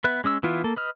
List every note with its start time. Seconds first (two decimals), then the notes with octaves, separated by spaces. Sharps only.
0.04 B3 B4 E5 F#6
0.24 G#3 C#4 D#6 E6
0.43 E3 B3 E4 F4
0.64 A#3 A4
0.76 B4 D#5 F6